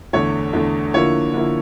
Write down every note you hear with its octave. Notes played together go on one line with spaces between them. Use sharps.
E2 D3 A3 C#5
E2 D3 A3
D3 F3 A#3 E4 C#5
D3 F3 A#3 E4